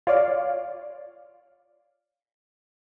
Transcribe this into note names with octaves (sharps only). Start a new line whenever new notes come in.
F4 C#5 D5 F5